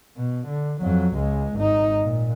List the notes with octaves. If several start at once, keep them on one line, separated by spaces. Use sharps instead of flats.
B2
D3
F2 F#3
C#2 G#3
G#1 D#4
A#2